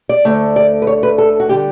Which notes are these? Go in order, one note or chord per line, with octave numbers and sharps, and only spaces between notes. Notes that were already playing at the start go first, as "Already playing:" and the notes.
D5
D2 D3 A3
D5
B4
C#5
B4
A4
F#4
D3 G3 G4